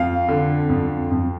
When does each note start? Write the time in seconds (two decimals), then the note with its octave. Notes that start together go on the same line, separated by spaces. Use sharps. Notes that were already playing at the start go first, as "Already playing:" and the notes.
Already playing: F2 F5
0.28 D3
0.69 F2
1.11 F2